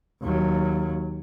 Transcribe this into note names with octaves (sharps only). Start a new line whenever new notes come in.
D#2 F#3